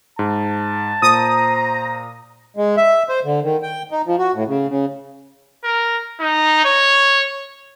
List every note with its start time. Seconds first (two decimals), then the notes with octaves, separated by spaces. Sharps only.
0.19 G#2 A5
1.02 A#2 C5 A#5 D#6
2.57 G#3
2.77 E5
3.09 C5
3.24 D3
3.43 D#3
3.63 G5
3.91 D#4
4.07 F3
4.19 F#4
4.34 A2
4.47 C#3
4.68 C#3
5.64 A#4
6.20 D#4
6.65 C#5